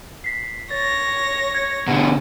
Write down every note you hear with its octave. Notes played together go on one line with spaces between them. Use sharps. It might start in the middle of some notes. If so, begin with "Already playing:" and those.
B6 C7
C#5 A6 A#6
G#6 C#7
B2 D3 F#5